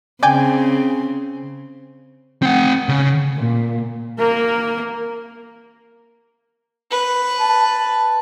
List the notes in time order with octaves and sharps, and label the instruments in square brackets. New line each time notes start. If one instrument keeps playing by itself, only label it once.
[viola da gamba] C#3 C4 [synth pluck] D5 G5 G#5
[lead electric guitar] C4 F#5
C#3
[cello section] A#2
[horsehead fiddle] A#3 A#4
[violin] B4
[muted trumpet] A5